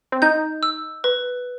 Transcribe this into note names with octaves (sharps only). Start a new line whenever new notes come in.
C4
D#4 G6
E6
B4